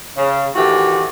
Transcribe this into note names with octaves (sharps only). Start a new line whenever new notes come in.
C#3
A2 D#3 E3 A3 F#4 G4